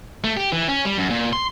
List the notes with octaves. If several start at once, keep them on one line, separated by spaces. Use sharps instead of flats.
A3
G4
E3
C#4
G3
F#2
A#2
C6